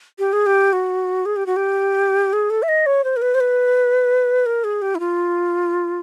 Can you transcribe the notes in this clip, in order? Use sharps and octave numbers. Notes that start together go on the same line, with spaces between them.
G4
G#4
G4
F#4
G#4
G4
F#4
G4
G#4
A4
E5
D#5
C#5
C5
A#4
B4
C5
B4
A#4
G#4
G4
E4
F4